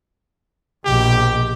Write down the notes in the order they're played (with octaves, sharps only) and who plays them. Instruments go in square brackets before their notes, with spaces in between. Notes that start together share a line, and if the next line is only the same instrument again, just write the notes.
[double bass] A#1 B2 [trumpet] G4